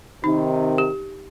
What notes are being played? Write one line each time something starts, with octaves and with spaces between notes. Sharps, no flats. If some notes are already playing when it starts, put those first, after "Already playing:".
C3 D#3 D#4
G4